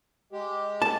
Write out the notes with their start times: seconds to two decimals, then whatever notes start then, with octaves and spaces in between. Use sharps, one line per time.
0.32 G#3 G4
0.82 A5